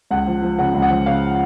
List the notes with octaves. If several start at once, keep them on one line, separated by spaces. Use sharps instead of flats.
C#2 F#5
F3
F3
C#3 F#5
C#2
F#5
F3
C#3 F5